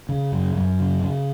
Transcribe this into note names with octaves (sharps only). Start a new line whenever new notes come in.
C#3
F#2
F#2
C#3
C#3